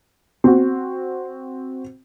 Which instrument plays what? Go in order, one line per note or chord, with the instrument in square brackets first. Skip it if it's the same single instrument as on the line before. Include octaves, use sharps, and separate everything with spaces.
[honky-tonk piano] C4 F#4